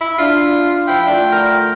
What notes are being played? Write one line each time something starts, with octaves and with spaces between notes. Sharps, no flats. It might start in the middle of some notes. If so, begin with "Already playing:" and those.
E4
D4 F4
F3 E4 F5 G5
D3 A3 D4 F4
A#4